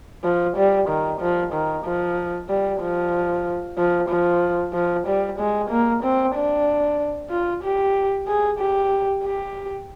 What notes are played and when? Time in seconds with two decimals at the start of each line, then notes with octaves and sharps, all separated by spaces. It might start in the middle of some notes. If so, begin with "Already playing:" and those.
0.24 F3
0.57 G3
0.88 D#3
1.20 F3
1.53 D#3
1.85 F3
2.49 G3
2.81 F3
3.78 F3
4.09 F3
4.74 F3
5.07 G3
5.39 G#3
5.70 A#3
6.03 C4
6.35 D4
7.30 F4
7.63 G4
8.28 G#4
8.59 G4
9.24 G4